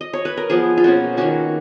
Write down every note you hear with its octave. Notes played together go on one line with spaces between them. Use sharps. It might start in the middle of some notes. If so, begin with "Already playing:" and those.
D#5
C#5
B4
A#4
F3 B3 G#4
F4
B2 A#3 C#4 F#4
D#3 A#3 C#4 F#4